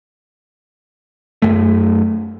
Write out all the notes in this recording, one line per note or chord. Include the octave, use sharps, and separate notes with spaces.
F#2 A3